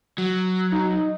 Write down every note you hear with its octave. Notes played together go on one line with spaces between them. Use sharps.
F#3
D#4